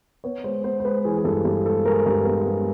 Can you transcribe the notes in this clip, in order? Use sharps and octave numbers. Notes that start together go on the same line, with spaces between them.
B3 C#5
G#3 C5
B3 C5
C5
G#3 B4
E3 G#4
G#4
G2 A4
G2
G#3 A4
G#3 A#4
G2
B3
G#3